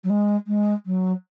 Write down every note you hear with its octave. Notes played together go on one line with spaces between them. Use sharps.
F#3
G#3
G#3
F#3